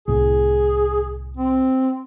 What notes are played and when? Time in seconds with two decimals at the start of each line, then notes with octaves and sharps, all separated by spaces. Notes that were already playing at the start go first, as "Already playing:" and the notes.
0.08 C2 A2 G#4
1.37 C4